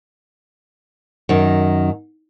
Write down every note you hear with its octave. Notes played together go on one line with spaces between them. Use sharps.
F#2 D#3